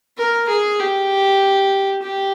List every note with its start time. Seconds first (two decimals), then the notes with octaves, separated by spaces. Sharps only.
0.17 A#4
0.48 G#4
0.79 G4
2.02 G4